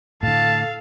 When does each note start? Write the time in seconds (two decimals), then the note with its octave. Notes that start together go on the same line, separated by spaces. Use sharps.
0.23 A2 D3 A4 F5 A5